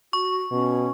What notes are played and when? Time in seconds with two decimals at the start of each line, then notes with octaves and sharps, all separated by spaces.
0.13 F#4 C#6
0.52 B2 C#4